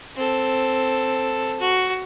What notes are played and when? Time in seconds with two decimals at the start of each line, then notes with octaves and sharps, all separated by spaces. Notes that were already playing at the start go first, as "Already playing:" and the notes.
0.16 C4 A4
1.60 F#4